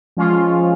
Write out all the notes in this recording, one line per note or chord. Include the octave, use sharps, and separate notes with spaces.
F3 G#3 C#4 F4